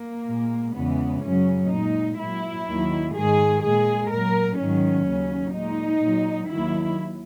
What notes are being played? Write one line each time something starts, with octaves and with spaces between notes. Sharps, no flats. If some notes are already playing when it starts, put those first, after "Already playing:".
Already playing: A#3
A#2 G#3
E2 C#3 E3 G#3 B3
F#2 C#3 F#3 C#4
A#2 G#3 D#4
A#2 F#3 E4
D#2 D#3 F#3
G#2 D#3 G#3 G#4
A#2 G#3 G#4
A#2 F#3 A#4
G#2 D#3 F#3 C#4
D#2 C#3 F#3
A#2 G#3 D#4
A#2 F#3
D#2 D#3 F#3 E4